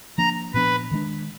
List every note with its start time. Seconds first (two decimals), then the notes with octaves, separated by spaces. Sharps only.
0.18 F3 A#3 D4 A#5
0.54 A#2 F3 B3 D4 B4
0.91 D#3 G#3 D4